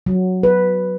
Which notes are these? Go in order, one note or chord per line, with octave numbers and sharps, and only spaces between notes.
F#3
B4